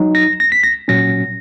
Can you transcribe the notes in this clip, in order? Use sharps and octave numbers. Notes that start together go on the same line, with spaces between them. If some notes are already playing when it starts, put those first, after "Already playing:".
Already playing: F#3 D#4
A#6
A#6
B6
A#6
A#2 F#3 C#4 A#6